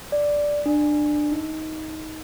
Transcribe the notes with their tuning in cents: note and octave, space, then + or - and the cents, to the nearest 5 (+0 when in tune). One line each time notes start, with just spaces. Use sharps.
D5 -5
D4 +20
D#4 +15